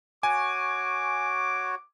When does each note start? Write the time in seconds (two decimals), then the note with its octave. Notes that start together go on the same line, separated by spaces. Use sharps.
0.23 F#4 C#5 G#5 D6